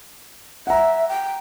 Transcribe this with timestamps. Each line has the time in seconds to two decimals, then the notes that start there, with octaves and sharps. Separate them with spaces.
0.67 E5 F#5 A#5
1.09 G5